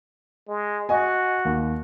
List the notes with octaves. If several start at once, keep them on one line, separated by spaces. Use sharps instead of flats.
G#3
F#4 D#5 G#5
D#2